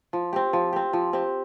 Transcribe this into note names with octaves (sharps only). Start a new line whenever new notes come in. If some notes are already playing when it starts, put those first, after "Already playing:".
F3
C4 G4
F3
C4 G4
F3
C4 G4